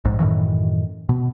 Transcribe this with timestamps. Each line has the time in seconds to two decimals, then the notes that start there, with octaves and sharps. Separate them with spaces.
0.05 A#1 G#2
0.19 F#2 A2 D#3 E3
1.09 B2